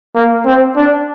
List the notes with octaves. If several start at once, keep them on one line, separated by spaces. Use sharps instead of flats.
A#3
C4
D4